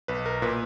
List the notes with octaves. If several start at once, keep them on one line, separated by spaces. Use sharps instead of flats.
B1 B4
A#4
A#2 B4